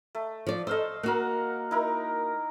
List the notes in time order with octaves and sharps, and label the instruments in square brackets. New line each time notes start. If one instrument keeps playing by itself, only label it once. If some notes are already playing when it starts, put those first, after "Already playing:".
[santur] A3
[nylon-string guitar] F3 D5
[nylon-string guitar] A4 C5 [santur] D#5 F5 E6
[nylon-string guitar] A#3 F#4 [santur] A#4 F#5
[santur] D#4 E4 A#4